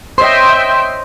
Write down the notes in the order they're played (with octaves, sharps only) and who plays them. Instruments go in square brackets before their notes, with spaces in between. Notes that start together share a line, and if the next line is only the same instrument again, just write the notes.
[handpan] C5 C#5 D#5 [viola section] E5 G5 [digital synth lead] C6